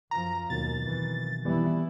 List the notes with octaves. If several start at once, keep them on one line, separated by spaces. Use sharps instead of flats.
F#2 F3 A#5
D#2 B2 D#3 F#3 A6
F2 E3
F2 E3 G3 B3 E4